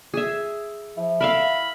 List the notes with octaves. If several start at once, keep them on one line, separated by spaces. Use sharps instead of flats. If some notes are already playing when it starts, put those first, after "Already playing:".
G#4 E5
F3 E4
A#4 E5 F5 B5